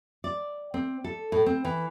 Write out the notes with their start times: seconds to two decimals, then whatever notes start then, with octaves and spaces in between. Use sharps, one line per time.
0.24 D5
0.74 C4
1.04 A4
1.32 A2
1.46 C4
1.65 E3